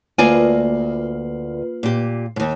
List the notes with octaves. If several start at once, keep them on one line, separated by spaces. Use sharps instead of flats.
D2 A#3 F4 B4 D5 G#5
A#2 G4
D#2 G#2